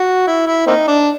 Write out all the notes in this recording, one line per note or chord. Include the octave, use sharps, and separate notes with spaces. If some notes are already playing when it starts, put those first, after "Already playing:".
Already playing: F#4
E4
E4
A#3 C4 D#4
D4